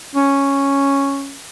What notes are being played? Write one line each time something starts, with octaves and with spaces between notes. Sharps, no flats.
C#4